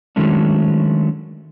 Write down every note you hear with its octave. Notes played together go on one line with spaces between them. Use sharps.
D#3 F#3 G#3 A3 C#4 D4